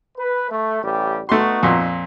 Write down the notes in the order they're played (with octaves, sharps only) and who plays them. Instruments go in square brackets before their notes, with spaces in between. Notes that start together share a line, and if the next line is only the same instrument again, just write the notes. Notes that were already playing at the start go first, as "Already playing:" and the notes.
[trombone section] B4
A3
A1 G3 G4
[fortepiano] A3 C6 [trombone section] B3 D#4 F#4
[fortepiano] F2 A#2